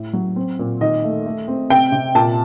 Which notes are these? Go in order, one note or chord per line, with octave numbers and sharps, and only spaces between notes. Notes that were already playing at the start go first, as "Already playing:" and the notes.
Already playing: A2
F#3
C4
A#2
D#3 D#5
A3
A3
C4
C3 G5
C3
A#2 A5